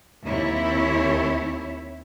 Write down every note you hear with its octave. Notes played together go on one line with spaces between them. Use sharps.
D#2 C4 E4 C#5 E5